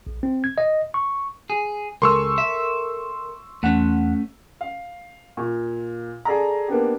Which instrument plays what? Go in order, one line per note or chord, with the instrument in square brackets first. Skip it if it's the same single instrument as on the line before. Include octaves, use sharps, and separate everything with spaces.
[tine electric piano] A#1
C4
G#6
D#5
C#6
[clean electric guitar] G#4
[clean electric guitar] C#2 G#3 [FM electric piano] A4 A#4 [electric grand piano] C6 C#6 E6
[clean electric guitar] E5
[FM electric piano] E2 F#5 [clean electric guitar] A3 C#4
[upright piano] F5
A#2
G#4 A4 D5 A#5
A#3 B3 D4 G4